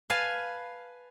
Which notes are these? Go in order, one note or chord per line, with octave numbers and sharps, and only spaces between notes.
B4 F5 G#5 A5